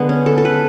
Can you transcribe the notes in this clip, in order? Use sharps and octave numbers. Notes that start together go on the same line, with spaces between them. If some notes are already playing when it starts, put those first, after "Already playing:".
Already playing: D3 G#3 B3
C#4
A4
A4
B4